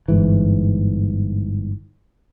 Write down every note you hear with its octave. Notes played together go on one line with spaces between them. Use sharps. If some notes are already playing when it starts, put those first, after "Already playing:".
G1 G#2 E3